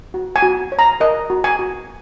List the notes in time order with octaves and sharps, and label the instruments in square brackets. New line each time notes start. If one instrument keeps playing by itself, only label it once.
[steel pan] F#4
G#5
F#4
C#5
A#5
A#4 D#5
F#4
G#5
F#4